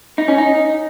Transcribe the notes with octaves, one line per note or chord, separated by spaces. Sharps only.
D#4
C#4
D#4